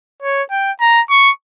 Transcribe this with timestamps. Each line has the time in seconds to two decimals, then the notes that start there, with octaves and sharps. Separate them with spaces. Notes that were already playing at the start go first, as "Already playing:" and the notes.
0.22 C#5
0.51 G5
0.80 A#5
1.10 C#6